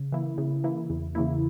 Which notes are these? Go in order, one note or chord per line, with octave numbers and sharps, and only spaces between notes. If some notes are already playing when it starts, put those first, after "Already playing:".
Already playing: C#3
E3 A#3 E4
C#3
E3 A#3 E4
E2
C#3 E3 A#3 E4